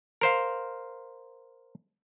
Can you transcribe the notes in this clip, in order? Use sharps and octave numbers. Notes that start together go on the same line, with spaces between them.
A#4 C5 F5